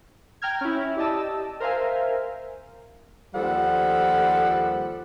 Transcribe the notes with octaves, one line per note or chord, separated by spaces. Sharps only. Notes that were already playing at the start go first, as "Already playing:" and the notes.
G5 A#5 F6 G#6
C#4 E4
G4 D5 D#5 A5 E6
A#4 C5 E5 F5 G#5
D#2 F3 G3 A4 F#5